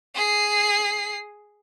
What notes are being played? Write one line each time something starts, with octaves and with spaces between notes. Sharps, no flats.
G#4 C7